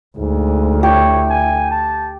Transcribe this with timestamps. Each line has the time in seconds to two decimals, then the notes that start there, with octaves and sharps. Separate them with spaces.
0.18 D2 G#2
0.83 E4 G4 C#5
1.30 G#5
1.71 A5